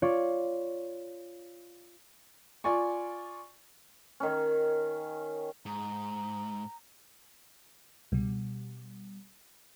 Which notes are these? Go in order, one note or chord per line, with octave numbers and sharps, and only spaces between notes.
F4 C#5 D5
F4 D5 G#5 C#6
D#3 C#4
G#2 A#5
C#2 B2 G3